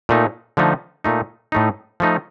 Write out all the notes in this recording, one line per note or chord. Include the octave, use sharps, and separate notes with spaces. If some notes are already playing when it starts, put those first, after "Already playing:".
A#2 A3 D#4
D3 F3 A3 D#4
A#2 A3 D#4
A2 A3 D#4
F3 A3 D#4